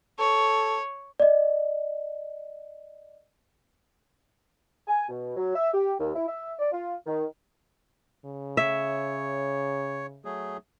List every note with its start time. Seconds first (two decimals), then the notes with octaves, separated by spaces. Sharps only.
0.19 A4 C#5
1.20 D5 D#5
4.88 G#5
5.09 B2
5.36 F#3
5.56 E5
5.74 G4
6.00 D#2
6.15 E4
6.28 E5
6.59 D5
6.72 F4
7.07 D#3
8.25 C#3
8.57 C#5 E5
10.25 F#3 A3 G#4